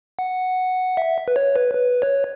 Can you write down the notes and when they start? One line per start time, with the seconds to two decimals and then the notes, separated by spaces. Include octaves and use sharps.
0.19 F#5
0.97 E5
1.28 B4
1.36 C#5
1.56 B4
1.75 B4
2.02 C#5